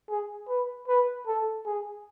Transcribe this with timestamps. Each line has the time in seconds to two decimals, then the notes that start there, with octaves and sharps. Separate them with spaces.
0.10 G#4
0.49 B4
0.88 B4
1.27 A4
1.66 G#4